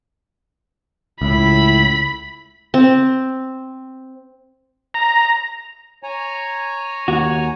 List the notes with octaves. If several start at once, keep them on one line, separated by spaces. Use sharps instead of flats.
C#2 A2 E4 B5
C4
A#5
C#5 G#5 A#5
D#2 F#4